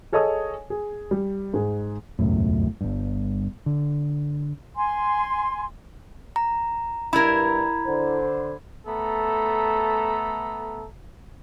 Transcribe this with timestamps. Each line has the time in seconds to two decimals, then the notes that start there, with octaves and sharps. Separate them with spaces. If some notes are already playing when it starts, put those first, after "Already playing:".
0.12 G#4 A4 C#5 D#5 G#5 D#6
0.70 G#4
1.11 G3
1.54 G#2 G#4
2.19 E1 C#2 F#2 A2
2.81 G1 G2
3.66 D3
4.75 G#5 C6
6.36 A#5
7.13 G2 E4 A#4 B5 G#6
7.87 D3 C5
8.86 A3 B3 A4 A#5